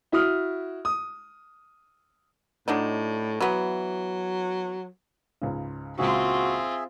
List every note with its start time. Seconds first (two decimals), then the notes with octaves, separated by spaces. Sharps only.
0.12 E4 F#4 D#6 F6
0.85 D#6
2.68 A2 F#3 D4 D#4
3.40 E3 F#3 B3
5.42 C#2 G#2 C#3
5.98 C#2 A#2 C#3 C4 F4 F#4 G#4 E5